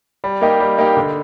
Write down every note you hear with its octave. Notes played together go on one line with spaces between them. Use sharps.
G3
A#3 D#4 G4
G3
A#3 D#4 G4
D3